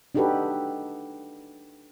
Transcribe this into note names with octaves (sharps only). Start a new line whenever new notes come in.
D4 D#4 F#4 G4 A4 B4